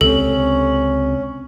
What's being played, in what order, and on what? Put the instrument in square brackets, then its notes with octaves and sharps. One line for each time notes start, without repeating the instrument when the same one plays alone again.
[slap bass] C#2 C3 C4 [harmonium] C#4 [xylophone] A4